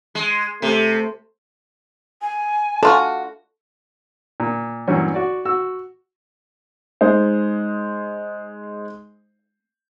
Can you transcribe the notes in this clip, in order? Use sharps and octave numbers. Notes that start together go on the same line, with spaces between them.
G#3
C3 A3
G#5
D4 F4 F#4 A4
A#2
G2 A#2 E3 F#3 C#4
F#4 D5
F#4 E6
G#3 D#4 C5